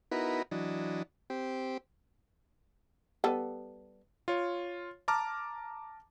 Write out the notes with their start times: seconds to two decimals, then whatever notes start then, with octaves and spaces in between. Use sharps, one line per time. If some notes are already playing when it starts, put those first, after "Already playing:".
0.12 B3 D#4 E4 F#4 A#4 B4
0.51 E3 F#3 D4 D#5
1.30 C4 G4
3.24 G3 B3 A4
4.28 F4 C#5
5.08 A5 A#5 D6 F6